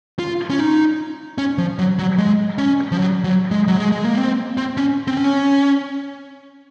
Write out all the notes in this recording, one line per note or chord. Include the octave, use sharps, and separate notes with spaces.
F4
C#4
D#4
C#4
F3
F#3
F#3
G#3
C#4
F3
F#3
F#3
G#3
F#3
G#3
G#3
A#3
C4
C4
C#4
C4
C#4